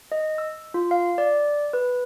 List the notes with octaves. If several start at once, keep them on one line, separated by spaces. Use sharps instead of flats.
D#5
E6
F4
F5
D5
B4